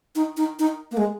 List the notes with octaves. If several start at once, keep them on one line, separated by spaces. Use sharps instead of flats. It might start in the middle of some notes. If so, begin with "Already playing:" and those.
D#4
D#4
D#4
A#3
G#3